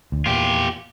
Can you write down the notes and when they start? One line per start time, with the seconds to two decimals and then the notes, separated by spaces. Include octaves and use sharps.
0.12 D2
0.26 E2 A#2 F4 G4